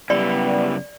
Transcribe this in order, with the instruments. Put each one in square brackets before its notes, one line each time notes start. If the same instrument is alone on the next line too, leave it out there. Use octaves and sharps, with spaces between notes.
[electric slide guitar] F#2 C#3 E4 [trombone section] G3 B3 [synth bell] D5